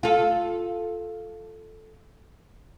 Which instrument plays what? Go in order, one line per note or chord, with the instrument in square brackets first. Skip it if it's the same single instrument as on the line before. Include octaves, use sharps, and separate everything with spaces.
[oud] F4 A4